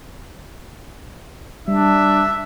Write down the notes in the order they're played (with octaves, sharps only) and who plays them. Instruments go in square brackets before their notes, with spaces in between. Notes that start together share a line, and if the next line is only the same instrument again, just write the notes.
[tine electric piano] G3 [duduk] D4 [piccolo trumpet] E5